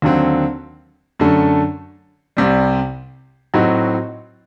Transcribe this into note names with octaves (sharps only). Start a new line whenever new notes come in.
D#2 D3 F#3 C4
F#2 D3 A3
C2 C3 G3
A2 F#3 C4 D#4 F#4